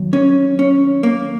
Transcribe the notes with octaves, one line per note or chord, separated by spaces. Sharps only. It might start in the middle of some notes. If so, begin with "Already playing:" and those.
Already playing: D#2 F#3
C#4
C#4
A#3